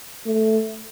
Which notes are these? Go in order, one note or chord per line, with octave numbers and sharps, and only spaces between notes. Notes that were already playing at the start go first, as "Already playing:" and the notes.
A3